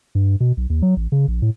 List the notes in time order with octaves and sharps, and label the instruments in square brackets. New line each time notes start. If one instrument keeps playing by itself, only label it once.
[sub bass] G2
B2
B1
D#2
F#3
A1
C#3
A#1
A2